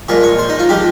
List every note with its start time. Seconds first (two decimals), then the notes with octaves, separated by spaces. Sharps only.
0.08 A#2 F3 G#3 G#4
0.23 C#5
0.39 C5
0.49 D#4
0.59 F4
0.69 F3 G#3 G4